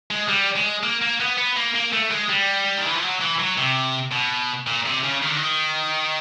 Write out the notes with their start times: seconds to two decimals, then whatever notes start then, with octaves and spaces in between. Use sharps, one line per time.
0.11 G#3
0.28 G3
0.56 G#3
0.83 A#3
1.02 A#3
1.20 B3
1.38 B3
1.56 A#3
1.75 A#3
1.93 A3
2.11 G#3
2.29 G3
2.78 D#3
2.86 E3
2.95 F3
3.03 F#3
3.21 E3
3.39 F#3
3.58 C3
4.12 B2
4.67 A#2
4.86 C3
5.03 C#3
5.22 D#3
5.29 D3
5.37 D#3